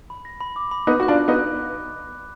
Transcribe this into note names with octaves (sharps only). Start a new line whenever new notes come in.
B5
A#6
B5
D6
B5
B3 D#4 F#6
F#4 F#6
D4 F4
F#6
B3 D#4
F#6